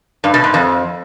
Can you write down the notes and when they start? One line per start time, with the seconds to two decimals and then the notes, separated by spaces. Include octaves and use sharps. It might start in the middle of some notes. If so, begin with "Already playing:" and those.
0.24 G2
0.34 B2
0.44 G#2
0.54 F2